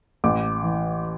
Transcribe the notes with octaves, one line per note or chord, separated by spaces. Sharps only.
A1 D6
E3